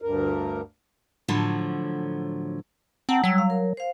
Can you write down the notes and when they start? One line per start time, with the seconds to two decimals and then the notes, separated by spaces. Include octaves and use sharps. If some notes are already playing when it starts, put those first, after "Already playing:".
0.02 D2 G2 A#4
1.28 A2 D3 F3 F#3
3.09 C4 F#5 A5 A#5
3.24 F#3 G3 C#5 E6
3.38 F5
3.50 A#4
3.77 C5 F5